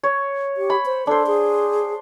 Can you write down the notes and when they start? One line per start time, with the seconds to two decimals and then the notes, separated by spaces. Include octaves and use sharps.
0.03 C#5
0.57 G4
0.70 B5
0.86 C5
1.07 D4 A4 C5
1.27 G#4